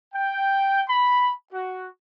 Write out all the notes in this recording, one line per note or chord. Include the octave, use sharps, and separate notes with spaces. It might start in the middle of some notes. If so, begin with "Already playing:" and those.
G5
B5
F#4